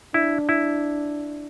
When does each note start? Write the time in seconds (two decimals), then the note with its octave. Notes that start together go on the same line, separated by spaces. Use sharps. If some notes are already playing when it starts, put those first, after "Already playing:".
0.14 D4 E4
0.49 E4